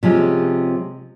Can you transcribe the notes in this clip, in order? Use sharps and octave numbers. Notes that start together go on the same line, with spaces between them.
C3 F3 G#3 C#4